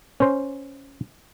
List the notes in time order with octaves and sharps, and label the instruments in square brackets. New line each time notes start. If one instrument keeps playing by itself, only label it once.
[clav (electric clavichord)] C#4 C5